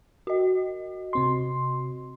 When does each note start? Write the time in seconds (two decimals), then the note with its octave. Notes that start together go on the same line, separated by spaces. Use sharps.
0.27 F#4 D#5
1.13 C3 C4 C6